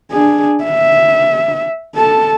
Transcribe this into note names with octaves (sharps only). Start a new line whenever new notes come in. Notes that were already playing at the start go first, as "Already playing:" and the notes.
D4 G#4
E5
A4 A5